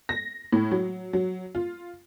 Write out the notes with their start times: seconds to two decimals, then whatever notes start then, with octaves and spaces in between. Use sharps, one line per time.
0.09 A#6
0.53 A2
0.71 F#3
1.13 F#3
1.55 F4